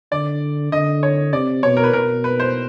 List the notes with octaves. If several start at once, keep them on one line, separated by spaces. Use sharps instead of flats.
D3 D5
D3 D#5
C#5
C3 D5
B2 C#5
A#4
B4
B2 A#4
B4
C5